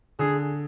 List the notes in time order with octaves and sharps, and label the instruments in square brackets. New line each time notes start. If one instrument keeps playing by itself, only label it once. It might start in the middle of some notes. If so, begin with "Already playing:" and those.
[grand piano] D3 [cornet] G#4